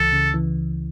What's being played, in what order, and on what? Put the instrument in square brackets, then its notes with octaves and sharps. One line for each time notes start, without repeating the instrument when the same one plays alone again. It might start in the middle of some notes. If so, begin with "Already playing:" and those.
Already playing: [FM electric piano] C#2 E3 [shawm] A4
[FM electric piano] C#3
E3